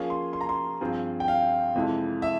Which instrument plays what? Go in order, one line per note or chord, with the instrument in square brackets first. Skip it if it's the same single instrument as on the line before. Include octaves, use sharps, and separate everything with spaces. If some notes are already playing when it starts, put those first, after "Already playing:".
Already playing: [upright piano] F3 A#3 C#4 F4 G#4
[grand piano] C6
C6
A#5
C6
[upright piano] G2 F3 C4 F4 G#4
[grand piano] G5
F5
[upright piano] F2 C3 E3 G#3 E4
[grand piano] E5